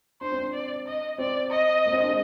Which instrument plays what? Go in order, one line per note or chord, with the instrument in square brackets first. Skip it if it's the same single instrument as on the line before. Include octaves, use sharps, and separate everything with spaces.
[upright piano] D4 [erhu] C5
[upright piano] C4
D4
[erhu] D5
D#5
[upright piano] C4 [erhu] D5
[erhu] D#5
[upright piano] A#3
C4
D4
G#3